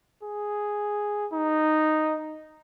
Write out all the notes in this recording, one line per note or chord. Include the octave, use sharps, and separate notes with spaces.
G#4
D#4